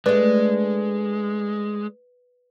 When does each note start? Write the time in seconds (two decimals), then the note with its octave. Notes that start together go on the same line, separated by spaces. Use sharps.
0.06 G#3 A3 D4 B4